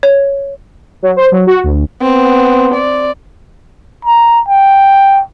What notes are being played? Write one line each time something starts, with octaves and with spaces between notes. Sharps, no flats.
C#5
F#3
C5
F#3
F#4
D2
B3 C4
D5
A#5
G5